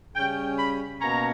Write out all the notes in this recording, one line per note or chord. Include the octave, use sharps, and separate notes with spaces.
C#3 G3 C#4 G5
B5
B2 A#3 C#4 A#5